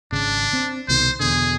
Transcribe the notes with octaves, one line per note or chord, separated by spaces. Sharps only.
G#1 C#3 D4
C4
C2 B2 D#3 C5
E2 B2 D3 G#4